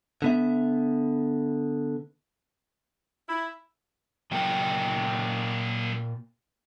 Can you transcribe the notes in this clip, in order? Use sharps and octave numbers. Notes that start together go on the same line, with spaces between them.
D3 B3 E5
E4
A#2 F#3 A#3 D#5 G5